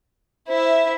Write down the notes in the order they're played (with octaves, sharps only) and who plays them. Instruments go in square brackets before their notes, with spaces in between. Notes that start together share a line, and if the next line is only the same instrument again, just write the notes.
[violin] E4 E5 [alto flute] C5